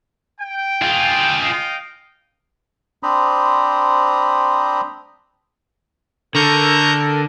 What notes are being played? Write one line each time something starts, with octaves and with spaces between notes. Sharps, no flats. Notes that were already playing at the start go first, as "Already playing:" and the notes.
G5
F4 G#4
D#5 F5 G5
C4 D4 C5 A#5 B5 D#6
D3 A4 A#4 A#5 C#6 G6